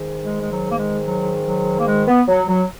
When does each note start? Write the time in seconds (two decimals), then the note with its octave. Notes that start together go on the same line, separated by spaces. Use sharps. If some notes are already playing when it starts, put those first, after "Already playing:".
Already playing: G#2 D#3
0.23 G#3
0.41 G#3
0.50 F#3
0.69 A#3
0.77 G#3
1.05 F#3
1.46 F#3
1.78 A#3
1.87 G#3
2.08 B3
2.28 F#3
2.49 F#3